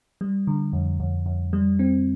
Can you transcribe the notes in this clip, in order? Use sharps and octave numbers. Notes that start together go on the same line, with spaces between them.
G3
D3
F2
F2
F2
G3
C4